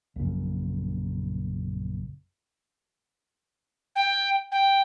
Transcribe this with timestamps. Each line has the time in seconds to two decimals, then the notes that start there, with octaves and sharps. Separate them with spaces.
0.16 A#1 F#2 C#3
3.96 G5
4.52 G5